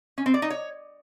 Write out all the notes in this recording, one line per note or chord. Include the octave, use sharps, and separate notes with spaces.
C#4
C4
D5
D#4
C#5